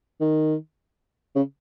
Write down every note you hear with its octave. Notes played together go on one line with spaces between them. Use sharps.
D#3
C#3